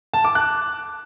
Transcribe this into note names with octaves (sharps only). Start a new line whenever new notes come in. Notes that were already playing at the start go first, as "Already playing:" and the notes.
A5
D6
F#6